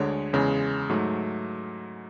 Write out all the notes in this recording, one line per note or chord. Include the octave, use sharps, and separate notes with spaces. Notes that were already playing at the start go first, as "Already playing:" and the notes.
Already playing: D2 D3 G#3 C#5
E2 C#3 G#3
G#2 F#3 A3